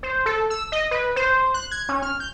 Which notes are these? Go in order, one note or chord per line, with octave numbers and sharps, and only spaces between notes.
C5
A4
E6
D#5
B4
C5
F#6
G#6
C#4
F6
G6